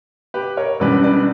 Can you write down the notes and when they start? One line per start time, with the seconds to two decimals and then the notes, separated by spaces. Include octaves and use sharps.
0.34 G4 B4
0.57 A#4 C#5
0.80 E1 E2 C#3 G3 B4 D5
1.04 B4 D5